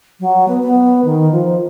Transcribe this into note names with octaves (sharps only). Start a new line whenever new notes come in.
F#3
B3
B3
D#3
F3